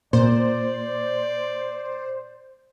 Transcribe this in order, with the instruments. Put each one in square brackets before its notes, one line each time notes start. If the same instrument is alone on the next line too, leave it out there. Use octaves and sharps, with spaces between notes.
[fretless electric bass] A#2 [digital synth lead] C5 [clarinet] D5